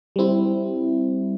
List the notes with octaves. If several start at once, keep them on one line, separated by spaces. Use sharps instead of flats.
G3 C4 E4